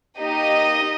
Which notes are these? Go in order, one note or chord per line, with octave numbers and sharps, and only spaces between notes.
A#3 D#4 G4 D#5